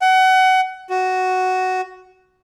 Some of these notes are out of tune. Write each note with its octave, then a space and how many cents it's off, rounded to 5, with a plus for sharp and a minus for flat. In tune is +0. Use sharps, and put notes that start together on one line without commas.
F#5 +25
F#4 +5